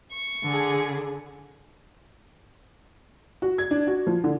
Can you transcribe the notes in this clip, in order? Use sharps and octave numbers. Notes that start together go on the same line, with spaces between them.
C#6
D3 G#4 A4
F#4
G#6
D4
F#4
F3
D3